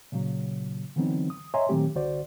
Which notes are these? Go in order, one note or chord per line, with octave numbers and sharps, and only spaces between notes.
A#2 C#3 F#3
D3 E3 F#3 B3 C4 D#4
D#6
C#5 D#5 E5 G#5 A#5 C6
A#2 D#3 F#3 A3 C4 G4
C2 D3 F#4 C5 D5